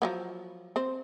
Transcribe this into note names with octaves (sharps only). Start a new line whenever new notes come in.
F3 F#3 B3
C4 C5